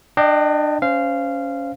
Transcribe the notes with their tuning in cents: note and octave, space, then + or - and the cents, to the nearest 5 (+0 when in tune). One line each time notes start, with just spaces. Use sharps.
D4 +25 D#5 -10 G5 +0
C#4 +10 C5 -20 F5 -15